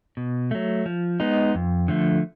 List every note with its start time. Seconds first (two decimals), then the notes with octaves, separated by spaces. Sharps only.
0.17 B2
0.51 F#3 A3
0.86 F3
1.20 G#3 B3 D#4
1.55 F2
1.88 D3 F3 A3